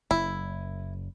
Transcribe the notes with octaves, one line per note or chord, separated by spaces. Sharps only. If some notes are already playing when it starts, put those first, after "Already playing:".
F#1 E4